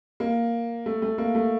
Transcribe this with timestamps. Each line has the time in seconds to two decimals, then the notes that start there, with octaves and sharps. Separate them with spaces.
0.20 A#3
0.86 A3
1.02 A3
1.18 A#3
1.35 A3